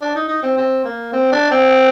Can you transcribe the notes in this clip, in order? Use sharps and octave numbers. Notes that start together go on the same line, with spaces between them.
D4
D#4
D#4
C4
C4
A#3
C4
D4
C4